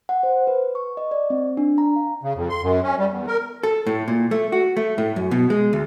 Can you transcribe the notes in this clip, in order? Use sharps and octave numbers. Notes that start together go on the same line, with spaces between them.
F#5
C5
B4
C#6
D#5
D5
C4
D4
A#5
F5
C#3
F2
C6
F#2
C#4
G3
E2
A#4
A4
A2
A#2
A3
F#4
A3
A2
F#2
B2
G#3
D2